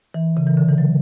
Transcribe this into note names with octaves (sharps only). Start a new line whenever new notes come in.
E3
C#3
E3
D3
E3
F#3